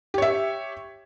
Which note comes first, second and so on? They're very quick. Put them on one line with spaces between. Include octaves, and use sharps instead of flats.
G4 C#5 E5